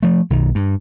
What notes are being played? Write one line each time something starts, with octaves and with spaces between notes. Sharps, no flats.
F3 A3
B1 D#3
G2